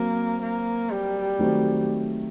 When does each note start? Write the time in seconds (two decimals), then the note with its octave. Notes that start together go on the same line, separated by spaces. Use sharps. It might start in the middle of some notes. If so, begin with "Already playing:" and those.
Already playing: F#3 A#3 C4
0.42 A#3
0.91 G3
1.39 D#3 F#3 A3 C4